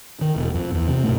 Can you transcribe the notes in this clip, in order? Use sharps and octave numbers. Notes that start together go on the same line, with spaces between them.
D#3
E1
F2
E2
C3
F#2 B2 A3